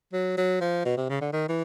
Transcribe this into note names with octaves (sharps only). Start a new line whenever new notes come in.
F#3
F#3
F3
B2
C3
C#3
D3
D#3
E3